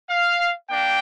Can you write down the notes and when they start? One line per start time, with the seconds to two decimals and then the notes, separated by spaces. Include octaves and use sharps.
0.10 F5
0.69 A#3 D4 G5